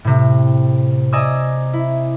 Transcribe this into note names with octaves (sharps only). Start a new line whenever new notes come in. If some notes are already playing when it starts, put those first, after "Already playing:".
A2 C3
D5 D#5 G#5 A#5 D#6 E6
E4